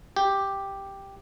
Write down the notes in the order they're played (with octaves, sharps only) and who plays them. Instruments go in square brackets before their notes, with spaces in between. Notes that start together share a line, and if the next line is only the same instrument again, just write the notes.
[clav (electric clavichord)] G4